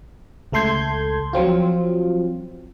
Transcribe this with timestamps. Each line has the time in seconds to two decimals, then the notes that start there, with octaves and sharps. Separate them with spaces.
0.52 C#2 A3 A4 C6 G6 G#6
1.33 F3 F#3 C4 F4